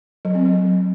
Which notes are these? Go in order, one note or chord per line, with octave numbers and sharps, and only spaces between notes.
F#3
C4
F#3